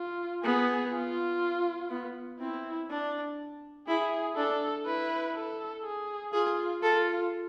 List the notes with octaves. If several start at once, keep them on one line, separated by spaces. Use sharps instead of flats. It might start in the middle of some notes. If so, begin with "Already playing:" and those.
Already playing: F4
B3 G#4
F4
B3
C4 E4
D4
E4 G#4
D4 A4
E4 B4
A4
G#4
F4 G#4
F4 A4